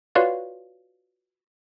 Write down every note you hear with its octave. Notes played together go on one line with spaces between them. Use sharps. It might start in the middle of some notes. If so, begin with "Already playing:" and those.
F4 F#4 B4 C#5 D5 F5